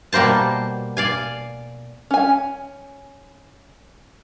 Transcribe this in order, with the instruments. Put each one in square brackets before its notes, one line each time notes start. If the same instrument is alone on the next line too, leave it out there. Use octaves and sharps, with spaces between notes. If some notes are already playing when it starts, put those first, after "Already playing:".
[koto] B2 G3 A#3 C5 A5
D5 F5 G#5
[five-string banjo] C#4 G#5